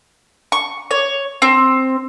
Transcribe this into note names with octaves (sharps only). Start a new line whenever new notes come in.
C#6
C#5
C4